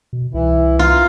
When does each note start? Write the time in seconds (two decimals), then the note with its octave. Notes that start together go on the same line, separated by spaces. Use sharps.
0.13 B2
0.34 C2 E3 E4
0.79 F4 A#5